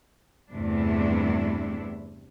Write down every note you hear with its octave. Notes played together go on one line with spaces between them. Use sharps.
E2 G2 C3 A3 D4 E4